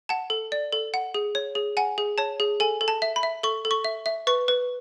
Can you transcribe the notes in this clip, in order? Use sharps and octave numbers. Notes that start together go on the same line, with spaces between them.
F#5 A5
A4
D5
A4
F#5
G#4
C#5
G#4
F#5 G#5
G#4
C#5 A5
G#4
A4 G#5
A4
A5
E5
B5
E5
A4 C#6
A4
C#6
E5
E5
B4 C#6
B4